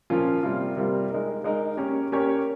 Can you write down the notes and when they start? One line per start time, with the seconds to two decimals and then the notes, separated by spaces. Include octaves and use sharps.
0.10 A#2 F3 A#3 C#4 F4
0.43 C3 G3 A#3 F4
0.76 C3 G3 A#3 F4
1.10 G#3 D#4 A#4
1.44 G#3 D#4 A#4
1.77 A#3 C#4 G4 A#4 C#5
2.12 A#3 C#4 G4 A#4 C#5